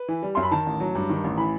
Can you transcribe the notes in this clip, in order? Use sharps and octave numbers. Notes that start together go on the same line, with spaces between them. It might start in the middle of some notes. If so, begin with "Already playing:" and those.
Already playing: B4
E3
G3
F#2 C6
B5
D#3 A5
A1
F#3
G2
D#3
A1
E3 B5